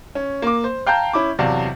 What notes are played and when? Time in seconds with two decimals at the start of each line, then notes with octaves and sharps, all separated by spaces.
0.15 C#4
0.42 A#3 D6
0.64 C5
0.86 F5 G5 A5 A#5 G6
1.13 C#4 E4 B5 D6
1.39 E2 C3 F#3 D5 F5 A5